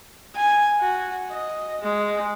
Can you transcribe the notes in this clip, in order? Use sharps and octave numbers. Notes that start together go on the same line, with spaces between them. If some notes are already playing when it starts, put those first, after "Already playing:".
G#5
F#4
D#5
G#3